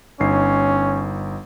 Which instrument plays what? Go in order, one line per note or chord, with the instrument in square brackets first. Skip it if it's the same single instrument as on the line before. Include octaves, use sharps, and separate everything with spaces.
[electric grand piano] G1 D#4 C7 [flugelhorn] C#4